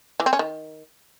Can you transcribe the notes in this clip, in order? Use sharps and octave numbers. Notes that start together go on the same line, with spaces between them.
E3
C4
C#4
D#3